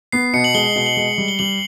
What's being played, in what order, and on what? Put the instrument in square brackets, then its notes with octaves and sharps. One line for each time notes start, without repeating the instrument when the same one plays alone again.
[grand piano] B3 [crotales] C7
[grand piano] B2 [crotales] C#7
[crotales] F#7
[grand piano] G#3 [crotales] G7
[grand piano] B2 [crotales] G7
[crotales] F#7
[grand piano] G#3
G3
[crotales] G7
[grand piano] G3 [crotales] F#7